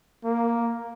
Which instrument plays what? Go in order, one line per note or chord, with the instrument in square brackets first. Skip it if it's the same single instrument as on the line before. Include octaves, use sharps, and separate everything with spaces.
[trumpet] A#3